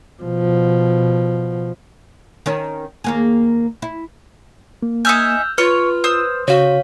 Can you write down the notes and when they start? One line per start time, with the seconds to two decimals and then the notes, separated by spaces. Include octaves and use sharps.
0.23 B2 F3
2.46 D#3 C#4
3.04 D#2 A#3 G#4
3.82 E4
4.83 A#3
5.05 D#4 E5 G#5 E6 F6 G6
5.58 F4 B4 C#5 F6
6.04 C5 D#6 E6
6.48 C#3 F#4 C#5 F5